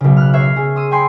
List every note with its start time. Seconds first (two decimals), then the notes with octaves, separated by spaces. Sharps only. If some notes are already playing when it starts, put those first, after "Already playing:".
0.01 B1 C#3
0.17 F6 F#6
0.33 C#5 E5 F6 G#6 B6 C7
0.56 G#4
0.76 C6 D#6 E6 D#7
0.91 G5 G#5 B5 C6